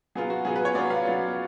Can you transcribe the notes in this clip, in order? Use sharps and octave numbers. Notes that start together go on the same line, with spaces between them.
F#3 B3 F4 G#4
F#4
F#3 B3 F4 G#4
B4
C#5
F#3 B3 F4 D5
F5
F#3 B3 F4